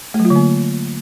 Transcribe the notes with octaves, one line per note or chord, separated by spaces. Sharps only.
A3
F#3
F4
D3
A#3